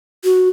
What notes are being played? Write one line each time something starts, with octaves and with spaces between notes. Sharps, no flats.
F#4